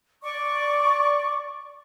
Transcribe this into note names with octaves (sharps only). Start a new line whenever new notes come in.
D5 C#6 D6